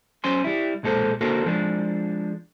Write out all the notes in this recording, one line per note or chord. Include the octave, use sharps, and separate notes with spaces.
F#3 C#4 C5 G#5 C6
G3 E4
B1 A#2 G#3 A4 C5
D3 A#3 F#4 A4 A#4 C5
F3 G#3 D4